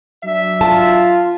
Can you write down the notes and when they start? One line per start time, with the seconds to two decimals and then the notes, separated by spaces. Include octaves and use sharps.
0.23 F#3 D4 E5
0.61 F4 A5